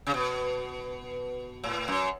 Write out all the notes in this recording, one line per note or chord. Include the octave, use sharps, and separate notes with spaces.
C#3
B2
A2
F#2